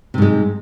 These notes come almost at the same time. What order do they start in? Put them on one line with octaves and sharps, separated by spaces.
C3 G#2 G#3